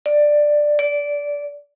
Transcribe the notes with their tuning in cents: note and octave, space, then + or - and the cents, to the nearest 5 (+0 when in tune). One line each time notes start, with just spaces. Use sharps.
D5 +10
D5 -15